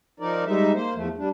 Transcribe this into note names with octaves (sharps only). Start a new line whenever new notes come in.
F3 D#4 A#4 D5
G3 G#3 D#4 E5
A#3 C5
E2 F3 A3
G3 D4